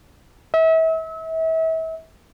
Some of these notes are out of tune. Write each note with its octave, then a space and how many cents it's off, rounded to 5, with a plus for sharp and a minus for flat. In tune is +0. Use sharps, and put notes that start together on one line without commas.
E5 -35